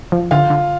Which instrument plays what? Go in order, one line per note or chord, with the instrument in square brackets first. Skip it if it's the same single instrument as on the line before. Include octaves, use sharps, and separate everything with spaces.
[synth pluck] F3
[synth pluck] D3 [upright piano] F4
[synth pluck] D3